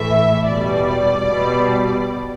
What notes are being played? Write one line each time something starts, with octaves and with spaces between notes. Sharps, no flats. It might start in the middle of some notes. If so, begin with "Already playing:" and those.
Already playing: A2 E3 A3 E5
E2 B2 G3 D5
B2 G3